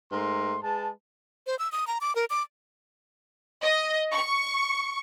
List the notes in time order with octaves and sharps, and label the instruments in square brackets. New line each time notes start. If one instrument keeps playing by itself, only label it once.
[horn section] G#2 A3 A#4 C6
G#3 B4 A5
[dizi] C5
E6
D#6
A#5
D6
A#4
D6
[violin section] D#5
C#6